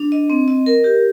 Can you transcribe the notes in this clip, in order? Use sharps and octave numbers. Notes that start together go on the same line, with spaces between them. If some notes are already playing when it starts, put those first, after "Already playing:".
Already playing: D4
D#5
C4
D#5
A#4
G4